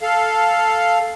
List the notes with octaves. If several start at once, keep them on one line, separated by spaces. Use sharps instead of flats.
A4 F5